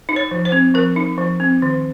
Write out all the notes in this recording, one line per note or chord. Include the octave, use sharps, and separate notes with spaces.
D#4
C#5
F3
C5
C4
F3 A#4
D#4
F3
C4
D#3